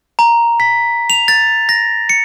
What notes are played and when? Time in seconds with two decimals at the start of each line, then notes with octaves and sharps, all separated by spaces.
0.19 A#5
0.60 B6
1.10 F7
1.28 A6
1.69 A#6
2.09 C#7